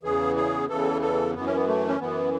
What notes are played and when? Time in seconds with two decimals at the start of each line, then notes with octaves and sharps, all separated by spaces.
0.03 E2 C#3 E3 G#4
0.36 G#4
0.69 E2 C#3 E3 A4
1.02 A4
1.34 F#2 E3 B3
1.46 C#4
1.56 B3
1.67 A3
1.88 C#4
2.00 F#2 E3 B3